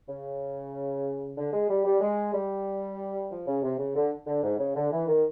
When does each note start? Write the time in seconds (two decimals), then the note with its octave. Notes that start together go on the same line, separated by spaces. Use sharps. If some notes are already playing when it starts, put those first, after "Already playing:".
0.08 C#3
1.38 D3
1.53 G#3
1.70 G3
1.85 G3
2.01 G#3
2.34 G3
3.30 F3
3.47 C#3
3.63 C3
3.78 C#3
3.95 D3
4.27 D3
4.44 G#2
4.59 C#3
4.76 D3
4.92 E3
5.07 D#3